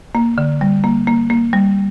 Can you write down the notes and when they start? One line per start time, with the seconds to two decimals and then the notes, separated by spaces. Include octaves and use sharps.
0.15 A#3
0.38 D3
0.61 G3
0.84 A#3
1.07 A#3
1.30 A#3
1.53 G3